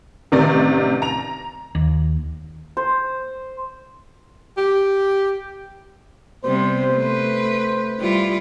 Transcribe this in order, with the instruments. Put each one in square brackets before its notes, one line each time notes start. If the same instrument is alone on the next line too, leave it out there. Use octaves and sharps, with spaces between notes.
[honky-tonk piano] A1 C3 D#3 D5 A6
A#5 F7
[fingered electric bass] D#2
[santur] C5
[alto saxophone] G4
[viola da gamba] C3 G3 B3 [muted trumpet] C5
[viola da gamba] A3 B4
G3 E4 F4